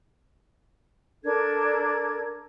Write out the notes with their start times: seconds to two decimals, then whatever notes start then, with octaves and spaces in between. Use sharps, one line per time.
1.24 D4 A4 A#4 G#6